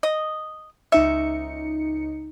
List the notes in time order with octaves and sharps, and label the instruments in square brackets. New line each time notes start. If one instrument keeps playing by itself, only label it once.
[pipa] D#5
[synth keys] C#2 D#4 C#7 [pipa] E5